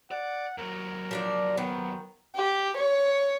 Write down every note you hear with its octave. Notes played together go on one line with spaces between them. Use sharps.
D5 F#5
D#2 F#3 A#4
F3 D4 D5
D#3 B3
G4
C#5